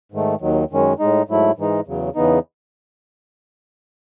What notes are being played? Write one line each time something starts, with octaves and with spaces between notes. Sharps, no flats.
G#2 D#3 A3
D#2 D#3 F#3
F#2 D#3 G#3 C#4
A2 G#3 D#4
G#2 F#3 A3 E4
G#2 E3 G#3 D#4
E2 C#3 F#3
E2 C#3 E3 B3 D#4